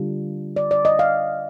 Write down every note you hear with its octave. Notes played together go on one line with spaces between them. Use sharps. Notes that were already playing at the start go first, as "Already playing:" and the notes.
Already playing: D3 G3 D4 F4
D5
D5
D#5
F5